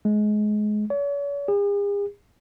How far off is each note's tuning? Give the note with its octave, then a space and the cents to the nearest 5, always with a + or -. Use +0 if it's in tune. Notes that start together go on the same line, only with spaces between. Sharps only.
G#3 +25
C#5 +40
G#4 -45